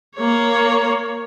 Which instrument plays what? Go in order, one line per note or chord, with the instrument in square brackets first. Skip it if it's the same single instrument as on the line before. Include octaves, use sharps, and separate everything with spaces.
[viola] A#3 C#5